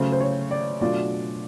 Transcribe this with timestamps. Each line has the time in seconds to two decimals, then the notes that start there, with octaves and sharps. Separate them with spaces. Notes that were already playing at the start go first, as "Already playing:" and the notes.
Already playing: C#3 F#3 A3 C#4 C5
0.12 C5
0.21 C#5
0.51 D5
0.81 B2 F#3 A3 D4 F4 D5